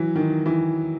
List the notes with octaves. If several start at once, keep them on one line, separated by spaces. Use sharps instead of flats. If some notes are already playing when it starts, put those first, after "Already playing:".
Already playing: E3 F#3
D#3
E3